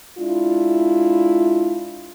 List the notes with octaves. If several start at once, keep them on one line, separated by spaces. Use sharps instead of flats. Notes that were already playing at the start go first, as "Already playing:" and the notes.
G#3 D4 E4 F4